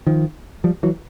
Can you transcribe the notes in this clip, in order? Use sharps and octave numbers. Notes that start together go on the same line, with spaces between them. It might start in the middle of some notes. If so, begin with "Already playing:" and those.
D#3 F3
F3 G3
E3 F#3